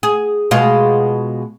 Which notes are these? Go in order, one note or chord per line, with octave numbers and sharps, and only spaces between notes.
G#4
B2 G#3 F4